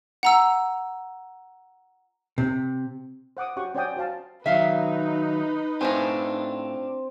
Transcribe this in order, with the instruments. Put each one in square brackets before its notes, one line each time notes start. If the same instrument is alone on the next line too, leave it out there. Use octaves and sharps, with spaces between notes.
[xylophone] F#5 A#5 E6
[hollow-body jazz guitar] C3
[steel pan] C5 F#5 D6 D#6
C#4 F#4 G4 F#5 C#6
C#4 C5 D5 F#5 G5 D#6
F#4 C5 F5 A5
[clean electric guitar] D#3 F#3 [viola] D#4 B4 [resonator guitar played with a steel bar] E5 F5
[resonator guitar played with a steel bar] A2 C5 G#5 [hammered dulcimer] C4 [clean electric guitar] D4 F4